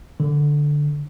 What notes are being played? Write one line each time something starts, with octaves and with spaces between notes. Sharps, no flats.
D3